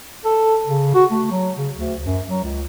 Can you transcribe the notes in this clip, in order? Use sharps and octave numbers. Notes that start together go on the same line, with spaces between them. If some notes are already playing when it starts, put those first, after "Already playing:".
A4
C#3
F#4
A3
F#3
C#3
D2
F#2
F#3
C#2